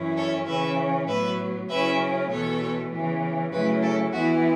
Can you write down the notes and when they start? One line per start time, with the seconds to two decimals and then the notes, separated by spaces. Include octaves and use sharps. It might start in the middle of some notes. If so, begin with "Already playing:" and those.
Already playing: F#2 E3 C#4 E4
0.16 A4 C#5
0.46 C#3 E3 C#4 B4 E5
1.08 A2 F#3 B3 B4 E5
1.68 C#3 F#3 C#4 E4 B4 E5
2.30 E2 B2 B3 A4 C#5
2.91 C#3 E3 B3
3.52 C#3 F#3 A3 E4 F#4 B4
3.82 A4
4.13 E2 E3 B3 E4 F#4